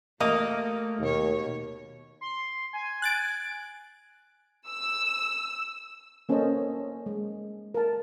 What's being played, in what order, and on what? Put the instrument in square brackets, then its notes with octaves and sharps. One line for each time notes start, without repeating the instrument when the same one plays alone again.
[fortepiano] A1 D#5 [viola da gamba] A3 [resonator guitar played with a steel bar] A#3
[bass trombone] D#2 [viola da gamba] B2 C#5
[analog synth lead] C6
G#5
[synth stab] F#6 A6 D7
[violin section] E6
[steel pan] A#3 C#4 A4 C5 C#5 D#5
G#3
A#4 A5